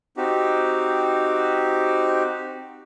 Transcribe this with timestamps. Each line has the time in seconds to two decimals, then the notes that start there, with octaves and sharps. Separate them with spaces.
0.17 C4 D#4 F#4 G4